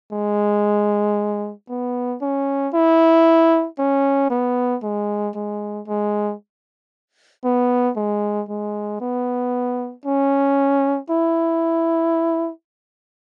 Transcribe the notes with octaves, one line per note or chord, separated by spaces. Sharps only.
G#3
B3
C#4
E4
C#4
B3
G#3
G#3
G#3
B3
G#3
G#3
B3
C#4
E4